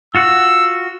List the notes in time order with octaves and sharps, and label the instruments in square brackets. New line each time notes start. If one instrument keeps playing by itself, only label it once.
[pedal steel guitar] F4 F#4 F#5 [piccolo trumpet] E6